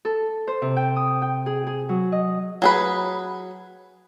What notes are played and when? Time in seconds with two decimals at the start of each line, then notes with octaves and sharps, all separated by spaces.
0.05 A4
0.47 C5
0.62 C3
0.76 G5
0.96 D#6
1.22 G5
1.46 G#4
1.67 G#4
1.89 F#3
2.12 D#5
2.62 F#3 G#4 B4